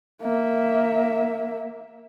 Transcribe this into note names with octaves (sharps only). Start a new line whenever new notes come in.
A#3 E5